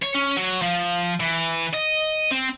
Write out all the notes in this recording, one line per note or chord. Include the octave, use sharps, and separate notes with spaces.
C#5
C#4
F#3
F3
E3
D#5
C4